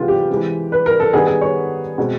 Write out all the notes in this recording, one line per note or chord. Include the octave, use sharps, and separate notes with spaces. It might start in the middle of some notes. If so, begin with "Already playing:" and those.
Already playing: C3 E3 G#3 B3 F4
G4
E3 G#3 C4
B4
A#4
A4
D#3 G3 B3 D#4 G#4
G#4
C#5
B2 G#3 C4